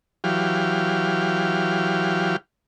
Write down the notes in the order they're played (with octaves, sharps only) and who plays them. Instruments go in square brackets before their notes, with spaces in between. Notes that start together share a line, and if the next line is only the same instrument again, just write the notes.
[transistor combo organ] E3 F#3 G4 F5